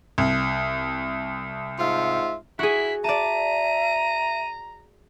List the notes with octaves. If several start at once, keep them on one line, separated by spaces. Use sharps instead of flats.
C2
G#2 F4 E5
E4 F#4 G#4 B6
D5 E5 A5 A#5 D#7